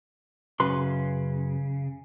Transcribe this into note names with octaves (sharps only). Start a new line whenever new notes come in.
F#2 C#3 B4 C6